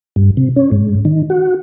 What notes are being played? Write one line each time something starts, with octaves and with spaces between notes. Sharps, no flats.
G2
C3
C#4
G#2
D#3
F#4